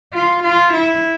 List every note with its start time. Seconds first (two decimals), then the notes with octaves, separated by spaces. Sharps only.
0.13 F4
0.44 F4
0.73 E4